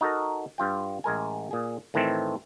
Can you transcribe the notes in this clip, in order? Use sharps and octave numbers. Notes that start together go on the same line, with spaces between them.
D#4 F#4 A4 A#4
G2 F4 G5
A1 G#3 A#4 G#5
A#2 G#4
A2 D#3 E3 A3 C4